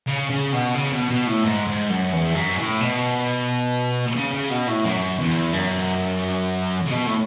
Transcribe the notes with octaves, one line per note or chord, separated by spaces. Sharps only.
C#3
C#3
B2
C#3
B2
B2
A2
G#2
G#2
F#2
E2
F#2
A2
B2
C#3
C#3
B2
A2
F#2
E2
F#2
C#3
B2
A2